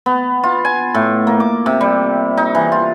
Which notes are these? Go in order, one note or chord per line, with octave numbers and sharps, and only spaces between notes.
B3
F4
G#5
A2
A#3
D6
C3
G3
D#4
E3
F4